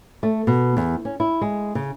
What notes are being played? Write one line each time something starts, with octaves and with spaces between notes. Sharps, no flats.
A3
B2
E2
C#4
E4
G#3
C#3